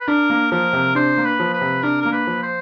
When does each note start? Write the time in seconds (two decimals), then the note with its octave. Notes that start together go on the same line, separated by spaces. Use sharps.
0.01 B4
0.08 D4 A#4
0.30 A#3
0.52 F3 A#4
0.73 C3
0.95 D4 C5
1.17 A#3
1.26 B4
1.40 F3
1.54 B4
1.61 C3
1.83 D4 A#4
2.02 A#3 A#4
2.12 B4
2.27 F3
2.43 C5